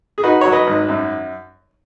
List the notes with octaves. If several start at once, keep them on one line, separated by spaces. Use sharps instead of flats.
G#4
D#4 F#4 B4
F#3 C#5
B4 D#5
G#1
F#2